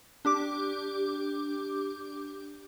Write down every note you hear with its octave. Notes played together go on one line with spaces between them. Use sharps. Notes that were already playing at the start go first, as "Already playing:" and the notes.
D4 G4 D6